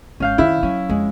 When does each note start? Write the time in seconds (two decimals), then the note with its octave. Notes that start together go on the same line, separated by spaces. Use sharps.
0.20 G#1 C#4 F5 G6
0.38 F#2 D#3 E4
0.63 F#3 C#4
0.89 F2 G#3